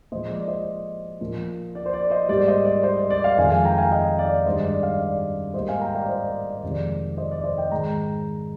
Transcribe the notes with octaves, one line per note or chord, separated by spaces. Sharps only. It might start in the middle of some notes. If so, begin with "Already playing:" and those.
A#2 F3 G#3 C5 D#5
D5
C5 D#5
A#2 F3 A#3
D5
C5
D5
C5 D#5
G#2 G3 A#3 D5
C5 D#5
D5
C5 D#5
D5
D5
D5 F5
F2 D#3 G#3 F5 G#5
F5 G#5
G5 A#5
F5 G#5
D#5 G5
D5 F5
G2 D#3 G#3 C5 D#5
D5
D5 F5
D5
G#2 G3 A#3 C5 D#5
F5 G#5
G5 A#5
D5 F5
C5 D#5
D5
D5
F2 C3 D#3 G#3 D5
D5
C5 D#5
D5
C5 D#5
D#5 G5
G#2 D#3 G#3 G5 A#5